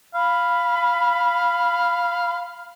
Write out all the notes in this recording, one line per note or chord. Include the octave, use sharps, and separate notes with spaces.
F5 B5